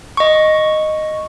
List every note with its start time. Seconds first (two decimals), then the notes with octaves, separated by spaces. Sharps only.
0.17 D#5 C#6